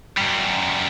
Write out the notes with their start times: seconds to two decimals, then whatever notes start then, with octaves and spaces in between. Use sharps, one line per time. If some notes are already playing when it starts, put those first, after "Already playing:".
0.17 F#2 G3